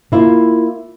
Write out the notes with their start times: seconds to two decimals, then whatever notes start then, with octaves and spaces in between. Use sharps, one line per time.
0.12 A#3 E4 F4